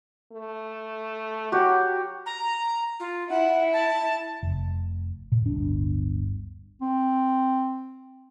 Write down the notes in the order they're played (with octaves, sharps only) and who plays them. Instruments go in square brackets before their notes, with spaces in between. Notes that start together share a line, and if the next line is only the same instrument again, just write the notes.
[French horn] A3
[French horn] F#3 [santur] F#4 G4
[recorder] A#5
F4
[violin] E4 [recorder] F#5
[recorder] A5
[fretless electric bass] F1
A#2
D1 G1 D4
[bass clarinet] C4